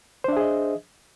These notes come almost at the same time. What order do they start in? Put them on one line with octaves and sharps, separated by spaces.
C5 D4 E5 G#4 D#5